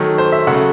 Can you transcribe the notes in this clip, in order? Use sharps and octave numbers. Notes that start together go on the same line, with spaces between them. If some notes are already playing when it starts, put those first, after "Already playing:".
Already playing: D#3 F#3 A3
C5
E5
C#3 F#3 A3 F#5